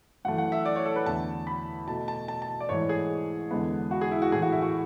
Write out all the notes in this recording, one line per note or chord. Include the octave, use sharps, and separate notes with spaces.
F#2 E3 A3 F#5
F#5
E5
D5
C#5
A4
B4
E2 D3 A3 A5
B5
B2 A3 A5
A5
A5
A5
D5
G#2 E3 A3 C#5
G#4
E2 D3 G#3 B3
F#4
G#4
E4
F#4
A2 E3 A3 G#4
F#4
E4
F#4